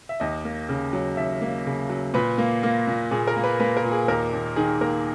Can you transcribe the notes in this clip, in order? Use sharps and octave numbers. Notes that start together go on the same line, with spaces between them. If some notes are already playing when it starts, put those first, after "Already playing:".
E5
D#2 D#5
A#3
C#3
F#3
D#2 E5
A#3
C#3
F#3
A#2 B4
A#3
A#3
A#2
A#2 G#4
A#4
A#3
B4
A#3 B4
A#4
A#2
G#4
D#2 A#4
D#2
D#3 G#4
A#3 A#4